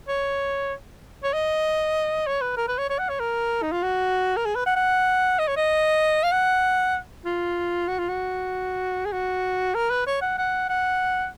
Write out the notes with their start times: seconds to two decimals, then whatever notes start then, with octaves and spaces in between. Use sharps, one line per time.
0.08 C#5
1.24 C#5
1.34 D#5
2.27 C#5
2.42 B4
2.57 A#4
2.68 B4
2.78 C#5
2.89 C#5
2.99 F#5
3.09 C#5
3.20 A#4
3.63 D#4
3.72 F4
3.83 F#4
4.37 A#4
4.45 G#4
4.56 B4
4.66 F#5
4.76 F#5
5.39 D#5
5.48 C#5
5.57 D#5
6.23 F5
6.32 F#5
7.25 F4
7.88 F#4
7.99 F4
8.09 F#4
9.05 G#4
9.12 F#4
9.75 A#4
9.90 B4
10.07 C#5
10.22 F#5
10.38 F#5
10.69 F#5